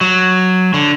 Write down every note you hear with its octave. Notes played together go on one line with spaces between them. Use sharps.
F#3
D3